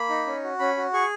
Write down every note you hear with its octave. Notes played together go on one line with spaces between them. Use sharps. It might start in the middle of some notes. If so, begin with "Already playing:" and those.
Already playing: A#3 B5
D#4
C#4
F#4
C#4 B5
F#4
G#4 C#6